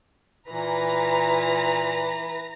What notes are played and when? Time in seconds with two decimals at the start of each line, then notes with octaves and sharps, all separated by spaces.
0.50 A#2 E3 B4 A#5 A#6